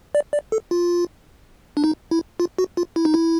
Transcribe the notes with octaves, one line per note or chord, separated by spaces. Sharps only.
D5
D5
A4
F4
D4
D#4
E4
F4
F#4
F4
E4
D#4
E4